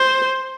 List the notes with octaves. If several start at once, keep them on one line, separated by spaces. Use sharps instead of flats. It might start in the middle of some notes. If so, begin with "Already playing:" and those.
Already playing: C5